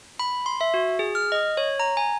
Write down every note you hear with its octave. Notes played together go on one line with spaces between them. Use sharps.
B5
C6
E5
F#4
G#4
F6
D#5
C#5
A#5
G#5